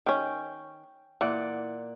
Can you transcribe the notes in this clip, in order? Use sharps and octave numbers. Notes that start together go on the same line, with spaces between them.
D#3 C#4 G5
A#2 E3 D5 F#5